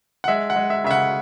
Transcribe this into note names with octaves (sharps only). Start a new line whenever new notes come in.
F#5
G#3 E5
F#5
G#3
E5
C#3 E5
F#5